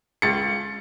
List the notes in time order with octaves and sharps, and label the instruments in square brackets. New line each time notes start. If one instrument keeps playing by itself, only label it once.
[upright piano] C#2 A6 C#7